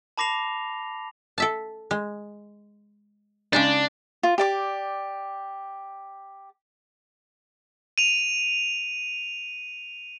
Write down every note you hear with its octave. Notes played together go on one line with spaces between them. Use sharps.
A5 B5 D6 A#6 C7 F7
A4 E5 A5
G#3
C#3 G#3 D4 D#4
F4
G4 D5 D6
D#7 F7